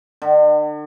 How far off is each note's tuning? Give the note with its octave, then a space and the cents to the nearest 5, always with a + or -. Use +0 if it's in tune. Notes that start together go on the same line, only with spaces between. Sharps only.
D3 +45